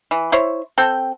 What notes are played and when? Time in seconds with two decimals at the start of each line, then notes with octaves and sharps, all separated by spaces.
0.11 E3
0.32 E4 C5 C#5
0.78 C4 A4 G5